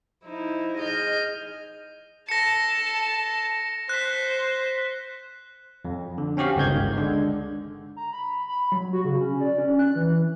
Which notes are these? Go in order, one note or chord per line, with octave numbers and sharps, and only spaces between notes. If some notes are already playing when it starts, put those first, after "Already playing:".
F3 D#4 E4
G#4 D#5 F6 G6
A4 A5 A#6 C#7
C5 F#6 B6
F2
D3
C4 C#4 F#4 G4 F5
G1 C#2 D#3 G6 G#6
D3 G#3
A#5
B5
B5
F#3
F#4
C#3
C#4
D5
C#4
F#6
E3